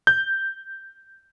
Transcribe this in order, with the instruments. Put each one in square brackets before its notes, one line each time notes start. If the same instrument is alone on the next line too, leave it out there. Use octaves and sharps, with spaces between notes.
[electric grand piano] G6